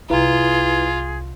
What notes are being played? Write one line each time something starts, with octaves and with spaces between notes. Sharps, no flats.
C2 E4 F4 G#4 B4 A#5